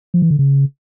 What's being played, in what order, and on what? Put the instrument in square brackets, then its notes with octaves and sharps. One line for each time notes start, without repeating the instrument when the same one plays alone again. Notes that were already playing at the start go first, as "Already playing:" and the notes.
[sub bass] F3
E3
D3
C#3